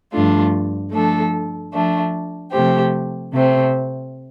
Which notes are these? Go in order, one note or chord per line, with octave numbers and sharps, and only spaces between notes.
G2 F3 A3 D4 F4
F3 A3 D4 A4
F3 A3 D4
C3 F3 A3 C4 G4
C3 A3 C4